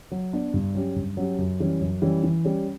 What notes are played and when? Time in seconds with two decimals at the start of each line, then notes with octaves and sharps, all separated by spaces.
0.12 F#3
0.33 B3 D4
0.54 G2
0.75 F#3 C#4 G4
0.96 G2
1.17 F#3 C#4 G4
1.38 F#2
1.60 E3 G3 C#4
1.81 F#2
2.02 E3 G3 C#4
2.24 E3
2.45 G3 C#4